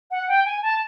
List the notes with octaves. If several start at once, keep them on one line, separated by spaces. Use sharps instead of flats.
F#5
G5
G#5
A5